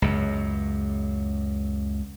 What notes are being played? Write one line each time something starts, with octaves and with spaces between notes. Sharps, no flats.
C#2 F#2